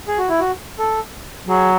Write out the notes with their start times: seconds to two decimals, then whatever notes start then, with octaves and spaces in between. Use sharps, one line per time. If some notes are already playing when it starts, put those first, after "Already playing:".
0.08 G#4
0.18 F#4
0.29 E4
0.40 F#4
0.79 A4
1.49 F#3 G#4